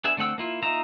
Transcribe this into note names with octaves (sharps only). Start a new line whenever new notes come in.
B3 D4 G#4 E5
D3 A3 C4 F#5 E6
A#3 E4 F4
A#3 D#4 F4 E5 A#5